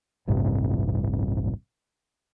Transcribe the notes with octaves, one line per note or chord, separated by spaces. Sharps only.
D#1 A1 G2 C3